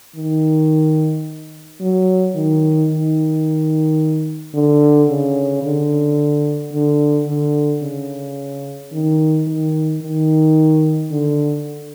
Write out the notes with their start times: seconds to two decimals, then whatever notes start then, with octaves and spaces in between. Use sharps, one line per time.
0.16 D#3
1.81 F#3
2.35 D#3
2.90 D#3
4.54 D3
5.09 C#3
5.63 D3
6.73 D3
7.27 D3
7.83 C#3
8.92 D#3
9.47 D#3
10.02 D#3
11.11 D3